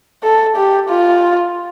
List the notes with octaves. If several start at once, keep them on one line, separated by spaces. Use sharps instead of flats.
A4
G4
F4